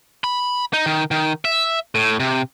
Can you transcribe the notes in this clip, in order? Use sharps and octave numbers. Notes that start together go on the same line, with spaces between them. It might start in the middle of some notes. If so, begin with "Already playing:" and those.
B5
D#4
D#3
D#3
E5
A2
C3